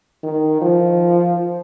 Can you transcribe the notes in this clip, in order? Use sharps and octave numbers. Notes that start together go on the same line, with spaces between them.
D#3
F3